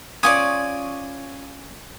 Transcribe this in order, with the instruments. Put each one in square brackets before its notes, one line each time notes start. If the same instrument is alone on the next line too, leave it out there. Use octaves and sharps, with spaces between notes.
[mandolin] C#4 C#5 D5 [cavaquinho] F4 D#6 [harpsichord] G#5